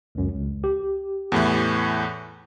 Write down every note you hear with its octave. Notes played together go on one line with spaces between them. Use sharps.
C#2 F#2
C#2
G4
E2 A2 E3